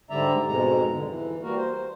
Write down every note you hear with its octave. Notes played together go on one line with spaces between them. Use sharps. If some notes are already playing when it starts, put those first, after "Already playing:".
G#2 D3 G3 D5 E5 A#5
F2 G#2 B2 G#3 A#5
G2 D3
E3
G3 A#3 F#4 A#4
C5